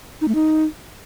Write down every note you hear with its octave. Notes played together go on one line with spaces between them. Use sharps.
D#4
A3
D#4